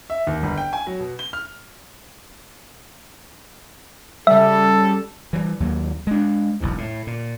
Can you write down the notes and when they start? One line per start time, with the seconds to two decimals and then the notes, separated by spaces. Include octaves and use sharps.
0.10 E5
0.27 D#2
0.43 G1
0.57 G5
0.73 G#5
0.87 F#3
0.99 B2
1.19 G7
1.33 F6
4.27 C#3 G3 A4 E5
5.33 E3 F3 G3
5.60 D#2 F#3 G#3 A#3
6.07 G#3 D4
6.60 E1 B1 E2 G#2
6.78 A2
7.07 A#2